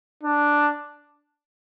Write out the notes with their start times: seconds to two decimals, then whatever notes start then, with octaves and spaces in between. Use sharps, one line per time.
0.23 D4